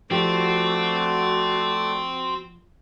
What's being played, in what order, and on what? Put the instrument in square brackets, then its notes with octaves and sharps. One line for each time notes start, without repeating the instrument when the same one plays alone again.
[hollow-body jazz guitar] F3 G4 [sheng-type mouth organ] A3 D5 [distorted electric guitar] C4 [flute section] F#4